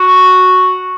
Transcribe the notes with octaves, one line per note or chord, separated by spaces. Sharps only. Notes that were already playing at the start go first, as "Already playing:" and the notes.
Already playing: F#4